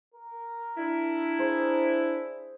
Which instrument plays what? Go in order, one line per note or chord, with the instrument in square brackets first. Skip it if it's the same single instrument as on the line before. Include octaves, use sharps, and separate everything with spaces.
[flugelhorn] A#4
[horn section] D4 E4
[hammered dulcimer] G#4 C5